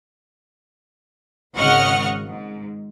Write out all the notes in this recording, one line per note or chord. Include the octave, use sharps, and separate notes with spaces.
G#1 C#3 D#5 F#5 C#6 F6
G#2